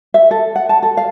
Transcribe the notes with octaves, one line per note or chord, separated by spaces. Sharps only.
E5
A4
F#5
A5
A4
F5